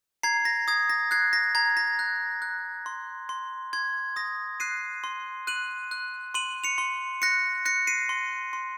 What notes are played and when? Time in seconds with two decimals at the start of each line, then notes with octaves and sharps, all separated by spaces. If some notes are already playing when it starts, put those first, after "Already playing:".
0.23 A#5 G#6 C7
0.45 A#6
0.68 D#6 G#6
0.89 A#6
1.11 F#6 G#6 C7
1.33 A#6
1.55 A#5 G#6
1.77 A#6
1.99 F#6
2.42 F#6
2.86 C6
3.29 C6
3.73 C6 G#6
4.16 D#6 A#6
4.60 F#6 C7 D#7
5.04 C6
5.47 F#6 D#7 F#7
5.91 F#6
6.34 C6 D#7 F#7
6.64 C#7 F7
6.78 C6
7.22 F#6 A#6 C#7
7.65 F#6 A#6 C#7
7.87 C7 D#7
8.09 C6
8.53 C6